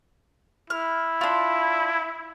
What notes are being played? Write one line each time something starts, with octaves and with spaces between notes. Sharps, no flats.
E4 F6
D4 F4